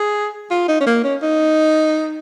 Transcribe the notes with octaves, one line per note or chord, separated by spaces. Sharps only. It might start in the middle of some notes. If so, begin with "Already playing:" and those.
Already playing: G#4
F4
D#4
C#4
A#3
C#4
D#4